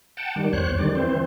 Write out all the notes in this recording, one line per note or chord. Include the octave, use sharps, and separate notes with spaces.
F#5 G5 A5
D#3 G3
E2 C5 C#5 F#6
D3 D#3 G3 D5
E3 C4 C5